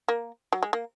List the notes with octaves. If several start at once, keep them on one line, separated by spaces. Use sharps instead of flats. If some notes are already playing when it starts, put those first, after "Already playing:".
A#3
F#3
G#3
A#3